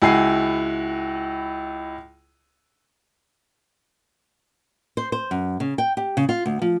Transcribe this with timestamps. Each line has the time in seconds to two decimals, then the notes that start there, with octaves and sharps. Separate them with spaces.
0.02 C#2 E4 F#4 G#5 C7
4.97 C5
5.12 C5
5.31 F#2
5.60 C#3
5.78 G5
5.97 G4
6.17 C#3
6.29 F4
6.46 D2
6.62 F3